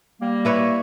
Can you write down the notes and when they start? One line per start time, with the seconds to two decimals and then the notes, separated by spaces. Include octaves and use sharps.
0.21 G3 A#3
0.45 E4 B4 C#5